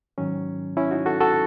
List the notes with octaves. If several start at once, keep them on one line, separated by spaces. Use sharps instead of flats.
G#2 D#3 F#3 C#4
C#4 E4
D#4 F#4
F#4 A4
F#4 A4